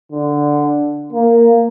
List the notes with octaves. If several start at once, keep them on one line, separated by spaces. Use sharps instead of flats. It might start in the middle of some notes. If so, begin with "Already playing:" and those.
D3
A#3